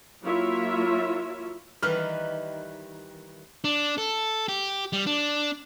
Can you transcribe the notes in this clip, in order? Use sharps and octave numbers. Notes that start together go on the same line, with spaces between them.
F#3 A#3 E4 F4 C#5 E5
D#3 E3 G3 B4 F6
D4
A4
G4
G3
D4